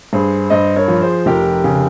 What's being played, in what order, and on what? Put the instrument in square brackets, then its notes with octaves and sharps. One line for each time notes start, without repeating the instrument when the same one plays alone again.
[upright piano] G2 [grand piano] G#4 C5
[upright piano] G2 [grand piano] C5 D#5
[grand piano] A#4 C#5
[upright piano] F3
[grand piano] G#4 C5
[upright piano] F1 [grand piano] G4 A#4
[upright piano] C#3